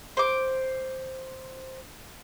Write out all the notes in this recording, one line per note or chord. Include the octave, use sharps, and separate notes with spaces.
C5 D6